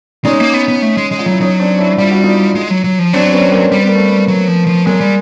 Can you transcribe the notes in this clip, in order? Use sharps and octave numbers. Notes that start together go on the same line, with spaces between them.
G#3 C#4 D#4
A#3
B3
B3
A3
G#3
G#3
F4
F#3 E4
F#3 C#4 D#4
C4 D4
D4 E4
G3 F4
F#4
D#4 F4
G#3
F#3
F#3
F3
F#3 C4 D4
B3 C#4
A#3 C4
G3 C4
B3
A#3
A3 B3
F#3
F3
F3
F#3 G#3 A#3
G3